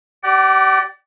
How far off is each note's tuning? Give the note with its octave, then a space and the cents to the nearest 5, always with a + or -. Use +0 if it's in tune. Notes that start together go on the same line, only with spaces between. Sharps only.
G4 -30 D5 +0 F#5 +45